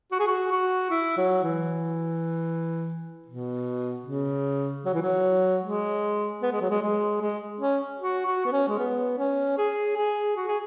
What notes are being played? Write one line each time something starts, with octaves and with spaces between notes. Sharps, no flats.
F#4
G#4
F#4
F#4
E4
F#3
E3
B2
C#3
F#3
E3
F#3
G#3
B3
G#3
F#3
G#3
G#3
G#3
C#4
F#4
F#4
B3
C#4
G#3
B3
C#4
G#4
G#4
F#4
G#4